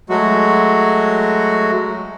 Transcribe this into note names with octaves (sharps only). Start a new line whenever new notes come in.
F#3 G#3 A3 F#4